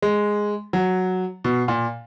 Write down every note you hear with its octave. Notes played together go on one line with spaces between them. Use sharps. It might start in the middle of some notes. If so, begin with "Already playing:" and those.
G#3
F#3
B2
A#2